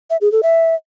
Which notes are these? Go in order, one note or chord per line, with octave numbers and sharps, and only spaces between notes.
E5
G#4
A4
E5